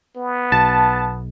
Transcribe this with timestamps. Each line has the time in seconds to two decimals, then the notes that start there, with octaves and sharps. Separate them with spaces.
0.17 B3
0.52 B1 A5